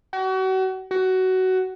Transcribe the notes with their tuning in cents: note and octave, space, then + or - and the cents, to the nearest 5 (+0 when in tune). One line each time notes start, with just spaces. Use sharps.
F#4 +35
F#4 +15